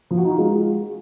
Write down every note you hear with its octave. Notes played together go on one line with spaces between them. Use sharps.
F3
F#4
D#4
F4
G#3